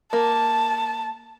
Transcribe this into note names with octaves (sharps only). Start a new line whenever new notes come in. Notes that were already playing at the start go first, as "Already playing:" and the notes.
A#3 A5